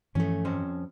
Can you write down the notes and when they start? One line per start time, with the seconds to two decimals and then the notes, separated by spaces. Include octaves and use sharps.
0.15 G2 E3 F3 A3 C#4
0.45 F2 C#4 C5